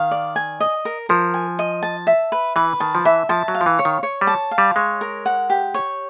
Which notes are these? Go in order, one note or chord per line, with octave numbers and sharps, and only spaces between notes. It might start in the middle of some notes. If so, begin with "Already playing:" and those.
Already playing: D#3 F5
D5
G#5
D#5
A#4
F3 A#4
G#5
D#5
A5
E5
B4
E3 B4
D#3 A5
F3
E3 E5
F3 A5
F#3
F5
F3
E3
C#5
D#3
C#5
G3
A5
F5
G3
G#3 C#5
A#4
F#5
G4
C#5